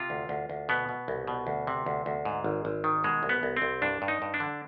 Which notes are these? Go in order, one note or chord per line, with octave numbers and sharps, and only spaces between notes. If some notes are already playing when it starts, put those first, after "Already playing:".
Already playing: C3 F4
D2
D2
D2
B2 B3
B2
C2
B2
D2
C3
D2
D2
G#2
G#1
G#1
D#3
B2 G#3
C2
B3
C2
C4
C2
G2 D4
G2
D#4
G2
D4
D3